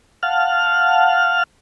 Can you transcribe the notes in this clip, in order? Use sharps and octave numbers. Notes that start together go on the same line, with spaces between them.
F5 F#5 A5 F6